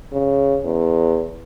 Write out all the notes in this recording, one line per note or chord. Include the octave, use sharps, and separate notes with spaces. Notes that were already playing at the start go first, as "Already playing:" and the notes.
C#3
E2